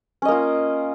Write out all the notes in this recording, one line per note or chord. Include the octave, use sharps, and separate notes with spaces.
A#3 C#4 F4 D#5